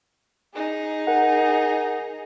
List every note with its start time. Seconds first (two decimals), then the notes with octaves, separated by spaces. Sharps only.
0.54 D#4 G#4
1.07 A#4 F#5